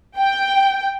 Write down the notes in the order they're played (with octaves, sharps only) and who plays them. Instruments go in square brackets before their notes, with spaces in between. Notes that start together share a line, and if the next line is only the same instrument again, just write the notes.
[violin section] G5